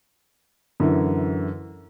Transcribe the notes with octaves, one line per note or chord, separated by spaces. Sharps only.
F#2 D3 E3